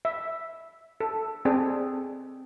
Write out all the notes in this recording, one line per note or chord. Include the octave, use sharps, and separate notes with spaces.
E5
A4
C4 G#4 A4 D5